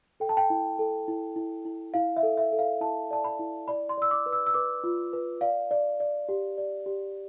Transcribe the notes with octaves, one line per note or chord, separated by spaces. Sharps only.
A4 G5
A5
G5
E4
A4
E4
E4
E4
E4 F5
E5
A4
E5
A4
F5
E4 A5
D5 A5
B5
E4
D5 B5
C6
D5 E6
D6
B4
E6
E6
B4 D6
F4
B4
D5 F5
D5
D5
G4
D5
G4